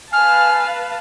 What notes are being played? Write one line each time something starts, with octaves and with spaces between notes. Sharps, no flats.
B4 F5 G#5 A5 F6